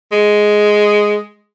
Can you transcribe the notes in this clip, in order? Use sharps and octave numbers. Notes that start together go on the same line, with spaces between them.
G#3